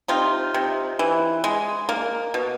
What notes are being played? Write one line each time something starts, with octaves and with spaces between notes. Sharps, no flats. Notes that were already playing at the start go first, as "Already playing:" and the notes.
C3 D#4 F4
C3
E3
G#3
A#3
B2